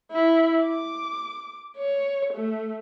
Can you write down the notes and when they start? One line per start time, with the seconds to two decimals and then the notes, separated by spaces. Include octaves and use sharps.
0.12 E4
0.62 D6
1.78 C#5
2.34 A3